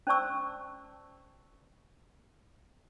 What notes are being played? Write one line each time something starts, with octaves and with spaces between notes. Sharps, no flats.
C#4 C5 D5 A5 C#6 E6